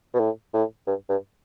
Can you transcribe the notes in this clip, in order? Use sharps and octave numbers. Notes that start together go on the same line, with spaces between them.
B2
A2
A2
G2
G2